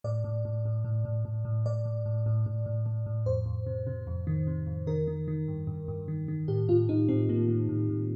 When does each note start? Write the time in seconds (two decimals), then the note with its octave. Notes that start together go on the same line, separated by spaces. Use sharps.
0.04 A2 D5
0.24 A2
0.45 A2
0.65 A2
0.85 A2
1.05 A2
1.25 A2
1.45 A2
1.66 A2 D5
1.85 A2
2.06 A2
2.26 A2
2.46 A2
2.66 A2
2.86 A2
3.06 A2
3.26 F2 C5
3.46 F2
3.67 C3
3.87 C3
4.07 F2
4.27 D#3
4.47 C3
4.67 F2
4.87 D#3 A#4
5.08 D#3
5.28 D#3
5.48 G2
5.67 G2
5.88 G2
6.08 D#3
6.28 D#3
6.48 A2 G4
6.69 A2 F4
6.89 A2 D#4
7.09 A2 C4
7.29 A2 A#3
7.49 A2
7.69 A2
7.89 A2